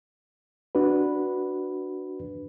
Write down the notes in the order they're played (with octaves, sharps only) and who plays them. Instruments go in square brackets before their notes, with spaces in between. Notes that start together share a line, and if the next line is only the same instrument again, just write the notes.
[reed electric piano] D4 F#4 B4